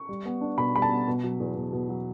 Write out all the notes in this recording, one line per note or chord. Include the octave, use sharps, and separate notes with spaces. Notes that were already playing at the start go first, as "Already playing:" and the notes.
Already playing: C#6
G3
B3
D4
B2 B5
G3 B5
A5
B3
B2
F#3
E2
E2
B2
F#3